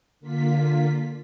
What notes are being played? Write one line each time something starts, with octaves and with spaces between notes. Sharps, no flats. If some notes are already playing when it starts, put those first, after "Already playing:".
D3 A#3 F4 B6